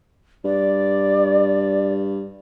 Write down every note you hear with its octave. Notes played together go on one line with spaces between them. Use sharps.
G2 D5